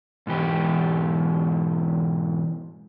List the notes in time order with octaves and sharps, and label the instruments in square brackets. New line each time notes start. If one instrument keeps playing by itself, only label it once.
[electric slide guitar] G#2 B2 E3 G4